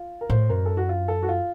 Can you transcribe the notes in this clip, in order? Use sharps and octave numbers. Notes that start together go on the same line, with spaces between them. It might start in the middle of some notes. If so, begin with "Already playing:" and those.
Already playing: F4
A#4
A2 C5
F#2 A#4
A4
F#4
F4
A4
F#4
F4